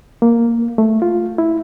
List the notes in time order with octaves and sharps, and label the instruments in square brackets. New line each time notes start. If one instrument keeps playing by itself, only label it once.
[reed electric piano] A#3
A3
F4
E4